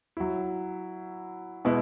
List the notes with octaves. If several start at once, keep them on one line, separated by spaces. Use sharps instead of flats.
F#3 E4
B2 G#3 B3 E4